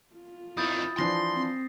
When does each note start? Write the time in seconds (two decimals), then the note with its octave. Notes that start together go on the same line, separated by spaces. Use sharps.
0.15 F4
0.57 F2 D#3 E4 D#6 G6 A6
0.99 E3 F3 D4 C6 A#6 C7
1.31 C4